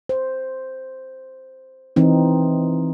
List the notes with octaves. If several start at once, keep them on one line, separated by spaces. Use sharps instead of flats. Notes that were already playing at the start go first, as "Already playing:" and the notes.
C5
E3 C4 D#4